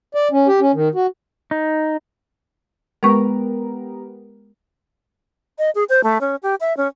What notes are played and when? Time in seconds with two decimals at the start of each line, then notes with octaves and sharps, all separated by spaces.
0.15 D5
0.32 C#4
0.48 G4
0.60 C#4
0.74 D#3
0.95 F#4
1.51 D#4
3.03 G#3 B3 G4 A#4 C#6
5.58 D#5
5.75 G#4
5.89 C5
6.04 A3
6.21 C#4
6.43 G4
6.60 E5
6.77 C#4